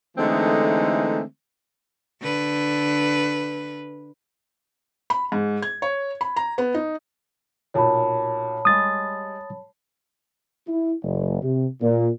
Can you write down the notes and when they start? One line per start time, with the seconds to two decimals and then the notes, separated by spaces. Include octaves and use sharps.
0.16 D3 E3 G#3 A3 C4 D#4
2.21 D3 B4
5.10 B5
5.32 G#2
5.62 G#6
5.82 C#5
6.21 B5
6.36 A#5
6.58 B3
6.74 D#4
7.74 B1 A#2 C#5 A5 B5
8.65 G3 G#3 D#6 A6
10.67 E4
11.03 F#1
11.42 C3
11.81 A#2